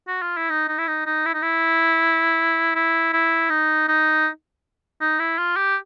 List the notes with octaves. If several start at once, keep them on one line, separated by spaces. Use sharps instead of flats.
F#4
F4
E4
D#4
D#4
E4
D#4
D#4
E4
D#4
E4
E4
E4
D#4
D#4
D#4
E4
F4
G4